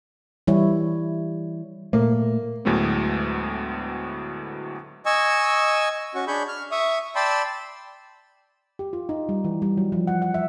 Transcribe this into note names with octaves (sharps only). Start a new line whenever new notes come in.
E3 G3 E4 C#5
A#2 A3 A#3
D2 A2 F#3 G#3 A3 B3
D#5 G#5 C#6 E6
C#4 F#4 C#6
D4 G#4 B5 C#6 G6
F6
E5 C#6 D#6
D5 G5 A5 B5 C6 E6
G4
F4
D#4
G3
E3
G3
F#3
F3
F#5
F#5
E5